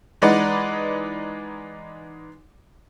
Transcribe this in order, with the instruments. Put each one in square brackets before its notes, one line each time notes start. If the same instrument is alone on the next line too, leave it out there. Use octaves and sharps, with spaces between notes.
[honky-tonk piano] E3 G#3 D#4 B4 D5 F#5